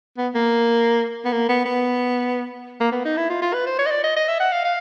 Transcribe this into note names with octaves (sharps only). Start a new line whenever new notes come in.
B3
A#3
B3
A#3
B3
B3
A#3
B3
D#4
E4
F4
F4
B4
C5
C#5
D#5
D5
D#5
D#5
E5
F#5
F5
F5